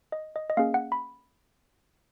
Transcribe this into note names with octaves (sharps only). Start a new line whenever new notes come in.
D#5
D#5
D#5
A#3 C#4 G#4 F5
F#5
B5